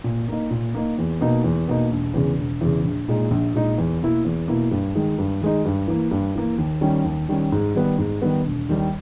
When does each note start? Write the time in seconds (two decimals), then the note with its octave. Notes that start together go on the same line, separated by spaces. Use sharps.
0.04 A#2
0.28 A#3 D#4
0.50 A#2
0.75 A#3 D#4
0.98 E2
1.21 B2 A#3 D#4
1.44 E2
1.68 B2 A#3 D#4
1.91 E1
2.14 E2 C#3
2.38 E1
2.61 E2 C#3
2.85 A#1
3.08 A#2 G#3 D#4
3.31 A#1
3.54 A#2 G#3 D#4
3.78 E2
4.01 B2 A#3 E4
4.25 E2
4.48 B2 A#3 E4
4.71 G2
4.95 D#3 G#3 D#4
5.18 G2
5.41 D#3 G#3 D#4
5.65 G2
5.88 E3 A#3
6.11 G2
6.35 E3 A#3
6.58 D#2
6.81 D#3 G3 C#4
7.04 D#2
7.29 D#3 G3 C#4
7.52 G#2
7.75 D#3 G3 B3
7.98 G#2
8.22 D#3 G3 B3
8.46 E1
8.69 D#2 D#3 G3